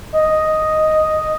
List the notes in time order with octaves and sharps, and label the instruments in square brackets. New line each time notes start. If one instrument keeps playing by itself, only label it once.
[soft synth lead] D#5